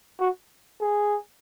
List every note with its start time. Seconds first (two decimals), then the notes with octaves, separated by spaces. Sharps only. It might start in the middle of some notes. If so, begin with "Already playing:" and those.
0.21 F#4
0.81 G#4